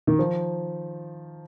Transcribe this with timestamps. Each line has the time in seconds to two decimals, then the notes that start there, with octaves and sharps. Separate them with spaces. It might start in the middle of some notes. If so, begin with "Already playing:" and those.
0.07 D#3
0.19 F3